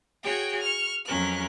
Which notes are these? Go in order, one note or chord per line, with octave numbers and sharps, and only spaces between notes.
F#4 G#4 C#5 G5
C#6 F6
F2 F#3 C#4 A#4 F#6